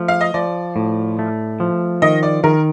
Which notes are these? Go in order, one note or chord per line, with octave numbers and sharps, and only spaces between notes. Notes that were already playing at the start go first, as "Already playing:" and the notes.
Already playing: F3 A3
F5
D#5
F3 D5
A2
A3
F3
D#3 D#5
D5
D#3 A#4